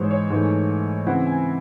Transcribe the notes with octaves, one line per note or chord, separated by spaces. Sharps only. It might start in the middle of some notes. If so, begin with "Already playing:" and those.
Already playing: G#2 E3 G#3 C5 C#5
C#5
G#2 E3 A3
C#3 E3 C4 E4 F#5
G#5